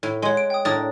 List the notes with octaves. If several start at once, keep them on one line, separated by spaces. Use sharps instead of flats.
A2
G#3 C#5 F#5 C6
D7
G5 D#6
A2 D4 A#4 D#6 A6